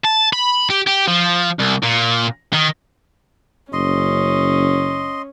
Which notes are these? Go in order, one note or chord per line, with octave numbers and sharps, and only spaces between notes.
A5
B5
G4
G4
F3
C2
A#2
D#3
F#1 C#4 D#5 C6